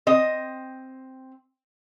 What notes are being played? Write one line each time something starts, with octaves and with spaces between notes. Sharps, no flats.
C4 D#5